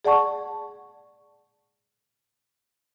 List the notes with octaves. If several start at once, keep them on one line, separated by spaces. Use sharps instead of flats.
G#4 D5 F#5 A5 C#6